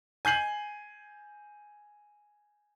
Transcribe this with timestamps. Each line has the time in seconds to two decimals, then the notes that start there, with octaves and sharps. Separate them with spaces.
0.25 G#5 G6 C7 F#7